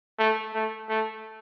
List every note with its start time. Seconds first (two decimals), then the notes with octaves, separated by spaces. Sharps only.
0.18 A3
0.54 A3
0.89 A3